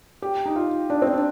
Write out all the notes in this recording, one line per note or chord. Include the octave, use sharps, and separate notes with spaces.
G4
D#4
F4
D4
C4
D4